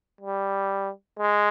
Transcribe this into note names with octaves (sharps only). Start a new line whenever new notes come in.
G3
G#3